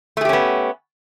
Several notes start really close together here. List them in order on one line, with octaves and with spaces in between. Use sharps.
A3 G#4 G4 C#4 B3